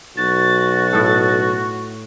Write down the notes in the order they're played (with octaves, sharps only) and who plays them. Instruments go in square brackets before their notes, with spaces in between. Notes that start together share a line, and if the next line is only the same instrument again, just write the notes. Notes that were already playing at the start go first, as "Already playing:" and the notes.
[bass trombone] B1 [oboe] F#4 [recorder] A6
[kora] A2 A4